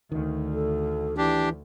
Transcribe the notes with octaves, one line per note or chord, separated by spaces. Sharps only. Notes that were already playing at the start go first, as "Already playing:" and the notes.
D2 D#3
A4
E3 D4 G4